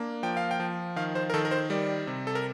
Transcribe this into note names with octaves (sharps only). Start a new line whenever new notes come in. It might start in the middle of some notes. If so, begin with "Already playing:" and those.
Already playing: A#3 D4
F3 G5
F5
G5
F3
D#3 F5
C5
A#4
D#3 A4
A#4
C5
G3 D5
C3
A4
A#4